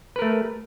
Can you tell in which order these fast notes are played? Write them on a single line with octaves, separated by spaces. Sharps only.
B4 A#4 A3